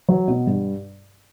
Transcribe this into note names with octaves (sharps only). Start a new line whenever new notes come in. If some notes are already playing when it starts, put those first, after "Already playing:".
F#3
B2
G2